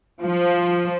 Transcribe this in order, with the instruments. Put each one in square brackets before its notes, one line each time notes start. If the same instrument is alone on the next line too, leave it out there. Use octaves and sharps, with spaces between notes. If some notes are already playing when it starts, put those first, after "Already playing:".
[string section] F3